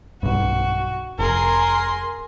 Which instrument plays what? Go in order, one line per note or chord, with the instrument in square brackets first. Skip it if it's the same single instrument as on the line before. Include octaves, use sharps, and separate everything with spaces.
[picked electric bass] B1 G2 [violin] F#4
[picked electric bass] F1 [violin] G#4 C6 [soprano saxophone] A#4